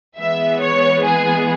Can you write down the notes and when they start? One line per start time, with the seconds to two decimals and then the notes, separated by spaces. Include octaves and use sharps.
0.17 E3 G#3 B3 E5
0.60 C#5
1.04 G#4